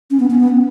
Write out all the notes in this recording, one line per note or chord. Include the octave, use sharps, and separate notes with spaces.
C#4
B3
C#4
B3